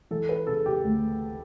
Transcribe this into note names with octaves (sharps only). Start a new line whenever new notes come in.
E3 A4
B4
C#3 A4
G4
D2